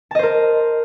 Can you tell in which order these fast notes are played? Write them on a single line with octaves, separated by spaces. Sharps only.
A5 D#5 C5 A#4